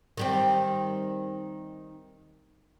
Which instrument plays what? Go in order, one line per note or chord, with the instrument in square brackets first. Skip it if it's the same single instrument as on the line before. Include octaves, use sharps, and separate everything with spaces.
[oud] D#3 G3 C4